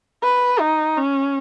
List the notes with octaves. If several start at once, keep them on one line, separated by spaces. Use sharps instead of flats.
B4
D#4
C#4